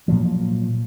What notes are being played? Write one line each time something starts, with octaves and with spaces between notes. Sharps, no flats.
A#2 F3 F#3